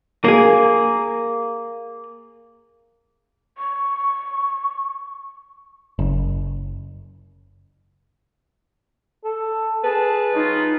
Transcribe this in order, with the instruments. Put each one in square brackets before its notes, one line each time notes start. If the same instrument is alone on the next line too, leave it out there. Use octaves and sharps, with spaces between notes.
[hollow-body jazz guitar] A#3 G#4
[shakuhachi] C#6
[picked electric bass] F#1
[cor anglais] A4
[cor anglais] G#4 [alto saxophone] B4 [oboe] A5
[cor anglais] F#3 [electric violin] D#4 [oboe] F4